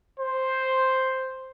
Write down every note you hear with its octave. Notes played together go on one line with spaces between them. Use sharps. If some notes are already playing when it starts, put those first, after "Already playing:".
C5